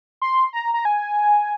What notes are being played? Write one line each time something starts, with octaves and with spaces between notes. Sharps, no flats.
C6
A#5
A#5
G#5